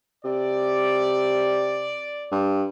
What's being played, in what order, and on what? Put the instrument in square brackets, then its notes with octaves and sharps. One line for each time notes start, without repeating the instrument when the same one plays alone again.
[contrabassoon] C3 [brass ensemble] D5
[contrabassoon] G2